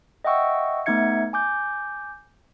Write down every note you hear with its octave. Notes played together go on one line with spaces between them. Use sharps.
D#5 E5 F#5 G5 C#6 E6
A3 B3 D#4 E5 G#6 C#7
G#5 D6 G6